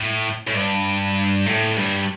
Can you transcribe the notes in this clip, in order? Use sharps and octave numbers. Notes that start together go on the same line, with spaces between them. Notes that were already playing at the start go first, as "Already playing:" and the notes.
Already playing: A2
A2
G2
A2
G2